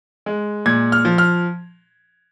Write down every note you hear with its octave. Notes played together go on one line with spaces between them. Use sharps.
G#3
A#2 G#6
F6
F3
F6